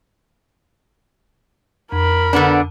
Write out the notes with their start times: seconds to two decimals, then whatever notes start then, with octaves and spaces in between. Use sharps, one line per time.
1.92 F2 A#4 B5
2.33 D3 B3 D4